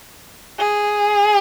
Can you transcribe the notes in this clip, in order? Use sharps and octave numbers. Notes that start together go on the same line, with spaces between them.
G#4